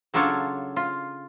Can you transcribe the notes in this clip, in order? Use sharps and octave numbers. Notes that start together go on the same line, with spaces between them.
C#3 F#3 D4 F4 A4 C#5
F4